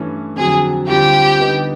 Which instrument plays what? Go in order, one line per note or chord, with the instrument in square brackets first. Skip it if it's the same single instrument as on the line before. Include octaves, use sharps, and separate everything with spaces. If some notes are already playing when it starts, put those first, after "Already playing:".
Already playing: [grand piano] G2 E3 A3 C#4
[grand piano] F2 D3 F#3 [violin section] G#4
[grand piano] D2 D3 G3 C4 F4 [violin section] G4
[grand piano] D3 G3 B3 D#4